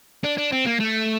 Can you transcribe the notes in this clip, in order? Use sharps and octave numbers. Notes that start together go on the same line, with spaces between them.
D4
D4
C4
A#3
A3